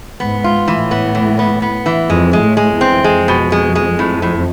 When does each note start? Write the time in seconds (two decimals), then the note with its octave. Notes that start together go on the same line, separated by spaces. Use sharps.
0.20 G#2 B3
0.44 F4
0.68 A2 E3
0.91 B3
1.15 E3
1.39 B3
1.62 B3
1.86 E3
2.10 F2 G#3
2.33 G#3
2.41 A2
2.57 G#3
2.72 E2 E3
2.81 C4
3.04 F2 G#3
3.28 B2
3.52 G#3
3.75 G#3
3.99 A2
4.22 A2